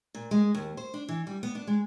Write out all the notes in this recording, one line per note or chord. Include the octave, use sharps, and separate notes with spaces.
A#2
G#3
D#2
C5
D4
E3
G3
B3
D4
G#3